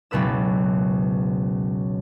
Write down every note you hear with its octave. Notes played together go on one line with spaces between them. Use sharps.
F#1 C#2 B2 B4 E6